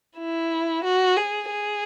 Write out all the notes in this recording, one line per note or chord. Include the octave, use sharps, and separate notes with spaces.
E4
F#4
G#4
G#4